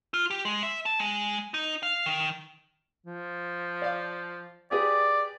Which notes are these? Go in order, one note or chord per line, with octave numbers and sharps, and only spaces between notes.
F4
G4
G#3
E5
A5
G#3
D#4
F5
D#3
F3
D5 F5
G4 G#4 B4 D5